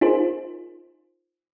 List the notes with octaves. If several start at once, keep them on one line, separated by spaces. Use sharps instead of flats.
D#4 F4 G#4 A#4 C5